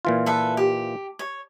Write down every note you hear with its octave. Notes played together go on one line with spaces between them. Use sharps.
A#2 E3 F4
A4 B4 E5
G4
C#5